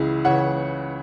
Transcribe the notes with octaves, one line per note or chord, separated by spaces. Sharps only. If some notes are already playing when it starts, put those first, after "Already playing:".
Already playing: C#2 C#3 E3 E4 G#4
C#2 C#3 E3 C#5 F#5